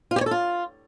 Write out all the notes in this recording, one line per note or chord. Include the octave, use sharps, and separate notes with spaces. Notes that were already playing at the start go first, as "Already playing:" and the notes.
F4
G4
C#5
A4
F4